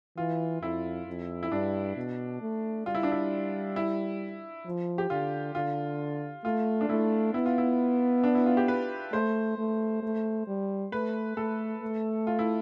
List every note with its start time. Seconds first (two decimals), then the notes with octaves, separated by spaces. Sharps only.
0.18 E3 F4
0.62 F2 E4
1.07 F2
1.43 E4
1.52 G2 D4
1.96 B2
2.41 A3
2.86 G3 F4
2.95 E4
3.03 D4
3.12 E4
3.76 E4
4.66 F3
4.98 G4
5.10 D3 F4
5.55 D3 F4
6.44 A3 F4
6.81 D4
6.89 A3 E4
7.34 B3 E4
7.46 F4
7.58 E4
8.24 D4
8.35 E4
8.46 F4
8.57 G4
8.68 B4
9.13 A3 C5
9.58 A3
10.03 A3
10.47 G3
10.92 A3 B4
11.37 A3 A4
11.83 A3
12.27 F4
12.39 E4